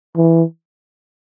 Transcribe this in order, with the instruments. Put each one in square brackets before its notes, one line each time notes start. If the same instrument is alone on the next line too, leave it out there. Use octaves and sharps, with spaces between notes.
[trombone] E3